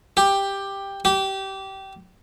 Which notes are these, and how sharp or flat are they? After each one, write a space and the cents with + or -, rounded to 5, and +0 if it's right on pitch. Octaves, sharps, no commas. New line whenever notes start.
G4 +10
G4 -20